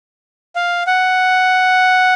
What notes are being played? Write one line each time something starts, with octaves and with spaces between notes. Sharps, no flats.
F5
F#5